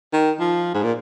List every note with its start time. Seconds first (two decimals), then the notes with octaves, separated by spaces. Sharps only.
0.13 D#3
0.40 F3
0.74 G#2
0.83 A#2